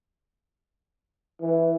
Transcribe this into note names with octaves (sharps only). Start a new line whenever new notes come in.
E3